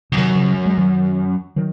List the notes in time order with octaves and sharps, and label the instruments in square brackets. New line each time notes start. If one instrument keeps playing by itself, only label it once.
[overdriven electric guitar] F2 [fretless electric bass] C#3
[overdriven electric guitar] F#2 [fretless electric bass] C3 D#3
[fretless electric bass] C#3 F3
F#3
G#3
D#3 F#3
D#3 F#3